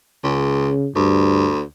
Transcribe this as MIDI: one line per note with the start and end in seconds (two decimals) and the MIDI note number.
0.24 0.73 37
0.24 0.88 49
0.96 1.62 38
0.96 1.50 43